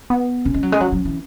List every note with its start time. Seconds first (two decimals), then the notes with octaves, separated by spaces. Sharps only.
0.10 B3
0.45 C#3 C#4
0.54 G#3
0.63 F#3
0.72 G#3
0.80 F#3
0.92 F#3
1.05 E3